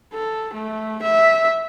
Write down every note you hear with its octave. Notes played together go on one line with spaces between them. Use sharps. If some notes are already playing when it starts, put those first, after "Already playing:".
A4
A3
E5